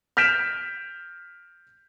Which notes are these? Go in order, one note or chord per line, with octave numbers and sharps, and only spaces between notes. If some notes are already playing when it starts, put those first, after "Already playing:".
F6 G6 B6 D7 E7